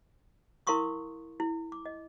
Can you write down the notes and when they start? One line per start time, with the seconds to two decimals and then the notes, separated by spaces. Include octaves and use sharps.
0.67 E4 A#4 F5 C6 C#6 D#6
1.40 E4
1.72 D6
1.86 D#5